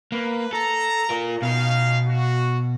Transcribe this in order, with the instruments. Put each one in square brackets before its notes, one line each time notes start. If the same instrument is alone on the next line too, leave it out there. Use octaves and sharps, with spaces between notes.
[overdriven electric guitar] A#3 [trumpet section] B4
[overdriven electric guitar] A4 [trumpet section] A#5
[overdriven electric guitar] F4 A#4
[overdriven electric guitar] B2 [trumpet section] C#4 D#4 F5
[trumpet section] F#4